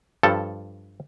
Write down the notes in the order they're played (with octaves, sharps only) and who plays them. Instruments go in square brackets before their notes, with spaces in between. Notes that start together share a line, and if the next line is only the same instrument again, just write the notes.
[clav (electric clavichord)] G2 F3 A4